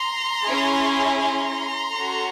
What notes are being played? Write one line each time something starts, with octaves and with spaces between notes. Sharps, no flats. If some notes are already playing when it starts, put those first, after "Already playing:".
Already playing: A#5 C6
C#4 E4 G#4
A#5 C6
C#4 F#4 A4